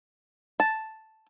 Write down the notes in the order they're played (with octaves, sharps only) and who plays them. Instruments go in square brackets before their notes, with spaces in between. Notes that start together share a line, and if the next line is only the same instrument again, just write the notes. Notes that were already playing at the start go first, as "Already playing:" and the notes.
[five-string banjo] A5